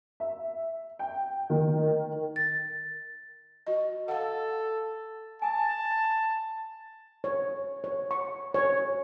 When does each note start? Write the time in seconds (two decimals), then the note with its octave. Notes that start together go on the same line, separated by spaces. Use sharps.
0.20 E5
0.99 G5
1.50 D#3
2.36 A6
3.67 F#4 D#5
4.08 A4 F5 F#5
5.42 G#5 A5 D#6
7.24 C#5
7.84 C#5
8.11 C#6
8.54 C#5